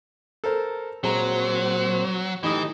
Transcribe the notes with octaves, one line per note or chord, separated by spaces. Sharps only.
A4 A#4 C5
A#2 F#3 G#3 C4 C5 A#5
A2 E3 D#4 G4 D#5 D#6